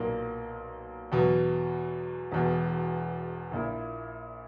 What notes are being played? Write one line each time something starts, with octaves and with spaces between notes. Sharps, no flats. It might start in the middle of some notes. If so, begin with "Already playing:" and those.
Already playing: B1 A#2 A#3
E2 B2 F#3
E1 E2 B2
A#1 A#2 A#3 E4